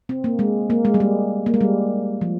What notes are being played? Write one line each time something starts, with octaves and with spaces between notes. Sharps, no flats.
C4
A#3
G#3
A#3
G#3
G3
G#3
A#3
G#3
G3
F3